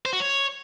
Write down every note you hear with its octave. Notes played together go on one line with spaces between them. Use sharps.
C5
F#4
C#5